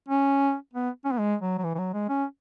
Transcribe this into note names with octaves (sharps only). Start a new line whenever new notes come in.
C#4
B3
C#4
B3
G#3
F#3
F#3
E3
E3
F#3
G#3
C#4